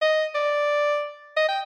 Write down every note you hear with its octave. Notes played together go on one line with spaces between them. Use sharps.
D#5
D5
D#5
G5